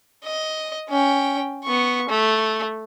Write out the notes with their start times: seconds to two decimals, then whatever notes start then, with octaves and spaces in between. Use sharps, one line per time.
0.24 D#5
0.89 C#4 G5
1.64 B3 C#6
2.09 A3